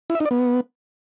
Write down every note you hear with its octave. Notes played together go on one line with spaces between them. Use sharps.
E4
E5
D#4
D5
B3